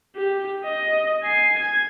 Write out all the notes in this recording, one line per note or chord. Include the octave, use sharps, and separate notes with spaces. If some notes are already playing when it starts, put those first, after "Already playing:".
G4
D#5
G#5 C7
G#6